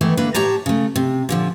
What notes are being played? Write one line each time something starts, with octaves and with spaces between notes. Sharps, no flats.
D#3 E3 A3 B3
D3 A#3 B4
A2 G4 C#5 A5 A#5
C#3 A3
C3
A#2 D3 F3